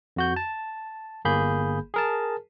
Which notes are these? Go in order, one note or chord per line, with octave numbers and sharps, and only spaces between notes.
F2 F#4 G6
A5
G1 A#3 G#4 B5 G6
G#4 A#4 A5